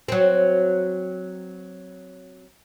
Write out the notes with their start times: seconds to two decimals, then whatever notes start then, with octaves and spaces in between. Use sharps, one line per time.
0.08 F#3 C4